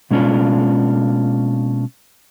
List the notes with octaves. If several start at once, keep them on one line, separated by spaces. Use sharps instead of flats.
B2 G#3 A#3 C#4 D4 F4